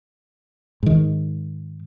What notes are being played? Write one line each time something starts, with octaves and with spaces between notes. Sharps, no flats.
G#2 D#3